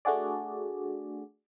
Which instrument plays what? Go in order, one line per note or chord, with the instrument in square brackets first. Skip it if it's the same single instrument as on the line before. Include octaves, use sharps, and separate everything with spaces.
[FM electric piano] A3 D4 F#4 G#4 D5